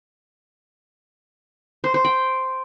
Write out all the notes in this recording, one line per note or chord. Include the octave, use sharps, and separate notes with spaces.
C5
C5
G5